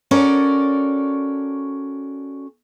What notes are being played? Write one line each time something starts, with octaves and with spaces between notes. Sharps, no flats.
C#4 F#4 A4 A#4 D5